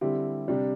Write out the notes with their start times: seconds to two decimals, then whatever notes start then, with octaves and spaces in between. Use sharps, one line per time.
0.01 D3 G3 C4 E4 G4
0.48 C3 G3 D4